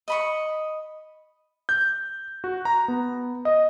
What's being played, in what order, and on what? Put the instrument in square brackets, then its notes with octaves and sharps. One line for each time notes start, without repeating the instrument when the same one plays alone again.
[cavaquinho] D#5 B5 C#6
[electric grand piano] G6
F#4
A#5
B3
D#5